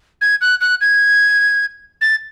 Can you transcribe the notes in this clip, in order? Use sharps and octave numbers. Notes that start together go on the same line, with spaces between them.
G#6
F#6
F#6
G#6
A6